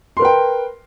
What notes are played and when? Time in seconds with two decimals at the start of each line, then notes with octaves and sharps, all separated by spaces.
0.17 C6
0.19 A#4
0.22 B4
0.25 G5